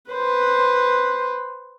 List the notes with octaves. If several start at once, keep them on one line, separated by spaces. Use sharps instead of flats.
B4 C5